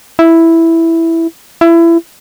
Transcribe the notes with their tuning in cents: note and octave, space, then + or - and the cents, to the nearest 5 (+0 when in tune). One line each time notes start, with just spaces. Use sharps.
E4 +0
E4 +25